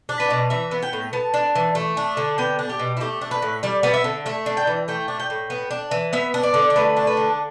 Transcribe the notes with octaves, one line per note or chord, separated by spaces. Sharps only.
D4
B4
B2
E3 E5
B3
G5
A2
B3 A5
D4
E3
A3
D4
D3
B3 G5
D4
G4
B2
E4
A3 G4
D4
B4
A2
G3 D5
B3 D5
E5
D3
A3 E5
D4
G5
E3
A3 G5
D4
G5
A2
B3
D4
E3
B3 E5
D4
D5
D3
D5
A3 B4
D4
B4
D3